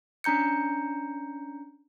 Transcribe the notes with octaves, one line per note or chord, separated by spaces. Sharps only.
C#4 D4 A#5 G6 C#7